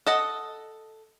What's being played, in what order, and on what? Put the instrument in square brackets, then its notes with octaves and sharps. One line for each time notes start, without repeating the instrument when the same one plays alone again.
[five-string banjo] A4 D#5 F#5